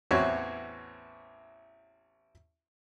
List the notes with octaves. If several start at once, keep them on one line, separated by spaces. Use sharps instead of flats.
A1 E2 C4 F#4 C#5 E5